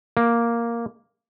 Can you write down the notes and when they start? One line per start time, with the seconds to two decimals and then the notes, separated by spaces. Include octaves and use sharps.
0.17 A#3